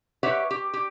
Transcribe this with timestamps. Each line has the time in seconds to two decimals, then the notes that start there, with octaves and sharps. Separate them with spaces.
0.23 G4 B4 C#5 E5 F#5
0.51 G4
0.74 G4